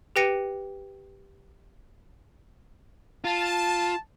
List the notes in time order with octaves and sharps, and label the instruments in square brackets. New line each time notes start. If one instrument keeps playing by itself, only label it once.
[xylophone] G4 B4 G5 A#6 C#7 D#7
[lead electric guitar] F4 [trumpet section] A5